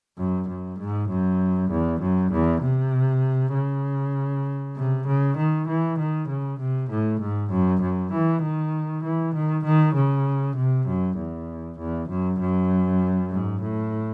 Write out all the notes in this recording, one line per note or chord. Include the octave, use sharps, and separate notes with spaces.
F#2
F#2
G#2
F#2
E2
F#2
E2
C3
C#3
C3
C#3
D#3
E3
D#3
C#3
C3
A2
G#2
F#2
F#2
E3
D#3
E3
D#3
D#3
C#3
C3
F#2
E2
E2
F#2
F#2
G#2
A2